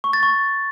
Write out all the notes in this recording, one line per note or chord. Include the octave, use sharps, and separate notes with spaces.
C#6
A6
C#6